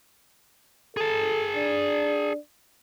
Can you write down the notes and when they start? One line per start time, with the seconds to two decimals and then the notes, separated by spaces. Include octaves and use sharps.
0.97 G#4 A4 A5
1.56 D4